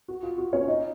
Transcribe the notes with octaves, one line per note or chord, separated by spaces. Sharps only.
F#4
F4
F#4
C#4 C#5
D#4 D#5